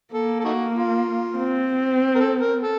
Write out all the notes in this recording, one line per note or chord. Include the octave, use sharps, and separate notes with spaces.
A#3 A4
A4
A3 D#4 F#4
F4
C4
A#4
A4
A#4
A4